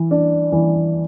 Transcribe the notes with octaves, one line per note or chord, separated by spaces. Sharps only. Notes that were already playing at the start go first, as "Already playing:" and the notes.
Already playing: E3
D4
E3